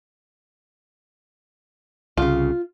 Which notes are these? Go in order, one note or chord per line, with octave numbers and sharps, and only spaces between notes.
C2 C#3 F4